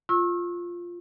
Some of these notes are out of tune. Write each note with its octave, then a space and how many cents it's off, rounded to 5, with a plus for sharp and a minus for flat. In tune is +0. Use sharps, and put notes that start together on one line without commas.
F4 +0 C#6 -35 E6 -15